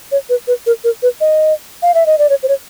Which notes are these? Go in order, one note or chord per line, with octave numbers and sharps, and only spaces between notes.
C#5
B4
B4
A#4
A#4
B4
D#5
F5
E5
D#5
D5
C#5
C5
C#5